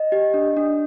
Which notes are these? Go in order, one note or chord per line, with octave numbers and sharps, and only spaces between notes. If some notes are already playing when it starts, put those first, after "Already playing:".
Already playing: D#5
G4
D4
D4